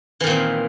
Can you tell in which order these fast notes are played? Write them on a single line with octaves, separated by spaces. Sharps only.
E3 D#3 A#2 C4